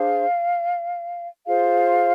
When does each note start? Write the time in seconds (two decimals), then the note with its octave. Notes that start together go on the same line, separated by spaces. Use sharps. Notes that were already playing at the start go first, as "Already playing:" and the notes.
Already playing: D4 G#4 C5 F5
1.46 F4 G#4 C5 F5